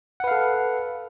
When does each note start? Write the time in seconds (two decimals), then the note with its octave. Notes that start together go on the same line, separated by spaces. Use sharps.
0.20 F#5
0.24 B4
0.28 F5
0.31 A4